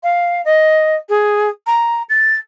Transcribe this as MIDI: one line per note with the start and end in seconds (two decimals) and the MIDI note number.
0.03 0.42 77
0.45 0.96 75
1.09 1.49 68
1.67 2.03 82
2.10 2.36 93